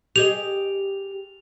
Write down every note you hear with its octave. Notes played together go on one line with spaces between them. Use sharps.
G4 G#4 D#5 F7